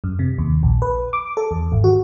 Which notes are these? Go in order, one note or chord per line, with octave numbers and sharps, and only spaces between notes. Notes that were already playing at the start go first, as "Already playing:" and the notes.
F#2
C3
D#2
A#1
B4
D6
A4
E2
G#1
F#4